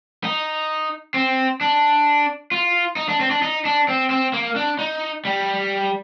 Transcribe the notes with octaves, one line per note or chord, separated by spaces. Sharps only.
D#4
C4
D4
F4
D#4
D4
C4
D4
D#4
D4
C4
C4
A#3
D4
D#4
G3